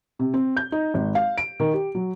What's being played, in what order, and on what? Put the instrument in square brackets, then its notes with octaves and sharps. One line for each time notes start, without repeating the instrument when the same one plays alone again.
[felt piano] C3
C4
G6
D#4
G#1
F5
D7
D#3
G4
F#3